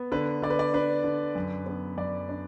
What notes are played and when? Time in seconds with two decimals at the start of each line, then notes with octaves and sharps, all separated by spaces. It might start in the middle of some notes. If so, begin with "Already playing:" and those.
Already playing: B3
0.12 D3 B4
0.42 D3 D5
0.50 B4
0.59 D5
0.74 D4 B4
1.04 D3
1.35 F#2
1.66 B3
1.97 F#2 D5
2.29 D4